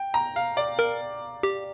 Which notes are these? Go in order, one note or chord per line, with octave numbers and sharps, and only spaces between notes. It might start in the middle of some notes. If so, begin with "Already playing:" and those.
Already playing: G5
A#5
F5
D5
A#4
G4